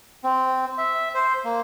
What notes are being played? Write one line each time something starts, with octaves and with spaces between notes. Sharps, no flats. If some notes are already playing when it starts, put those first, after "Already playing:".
C4
E5
C5
A#3